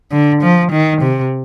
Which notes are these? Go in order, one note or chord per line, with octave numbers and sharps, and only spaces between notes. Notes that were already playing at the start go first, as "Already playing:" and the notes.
D3
F3
D#3
C3